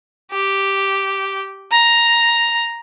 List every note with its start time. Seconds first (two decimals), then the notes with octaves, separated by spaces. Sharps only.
0.32 G4
1.71 A#5